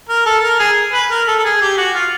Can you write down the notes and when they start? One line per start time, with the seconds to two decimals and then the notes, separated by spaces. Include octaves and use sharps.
0.09 A#4
0.26 A4
0.43 A#4
0.59 G#4
0.93 B4
1.11 A#4
1.28 A4
1.38 A4
1.44 G#4
1.61 G4
1.77 F#4
1.94 F4